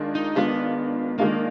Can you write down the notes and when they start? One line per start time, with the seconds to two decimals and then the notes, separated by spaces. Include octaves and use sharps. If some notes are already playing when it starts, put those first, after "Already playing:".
Already playing: D#3 G#3 D4 F4
0.15 D#4
0.35 D#3 G#3 B3 D4 F4
1.19 D#3 G#3 A#3 D4 F4